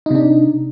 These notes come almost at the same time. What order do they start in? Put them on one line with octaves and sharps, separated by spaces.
D#4 C3 D4